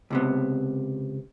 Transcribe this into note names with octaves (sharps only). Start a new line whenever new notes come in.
C#2 C3 B3